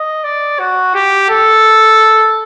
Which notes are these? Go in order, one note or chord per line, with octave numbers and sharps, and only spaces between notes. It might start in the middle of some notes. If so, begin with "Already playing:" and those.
Already playing: D#5
D5
F#4
G4
A4